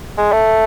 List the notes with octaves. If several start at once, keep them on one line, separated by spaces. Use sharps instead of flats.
G#3
A3